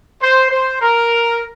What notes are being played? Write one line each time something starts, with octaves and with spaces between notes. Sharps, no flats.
C5
C5
A#4